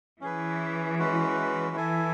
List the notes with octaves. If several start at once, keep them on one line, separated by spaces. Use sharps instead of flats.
E3 C#4 G#4 B4
G#3 C#4 F#4 B4
E3 E4 A4 E5 G#5